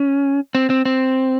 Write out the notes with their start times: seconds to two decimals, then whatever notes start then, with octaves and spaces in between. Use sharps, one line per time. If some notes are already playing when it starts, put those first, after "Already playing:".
Already playing: C#4
0.55 C4
0.70 C4
0.85 C4